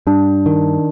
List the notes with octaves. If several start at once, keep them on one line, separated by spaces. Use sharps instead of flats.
G2 D4
D#3